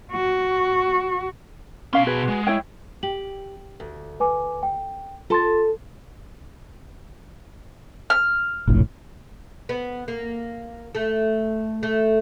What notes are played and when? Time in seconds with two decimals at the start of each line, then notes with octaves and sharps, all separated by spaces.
0.12 F#4
1.93 B2 C#4 F5 C6
2.07 F#4 G#4 B4
2.28 G#3
2.47 E4 C#5 G5
3.03 G4 F#7
3.80 D2
4.20 B4 G#5 D6
4.63 G5
5.30 F4 A4 A5 C6 A6
8.10 F6
8.67 F1 A#1 A2
9.69 B3
10.08 A#3
10.95 A3
11.83 A3